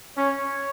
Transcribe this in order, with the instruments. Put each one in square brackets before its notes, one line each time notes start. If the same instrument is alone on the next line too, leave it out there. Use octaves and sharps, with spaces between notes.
[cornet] C#4 [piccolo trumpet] C#5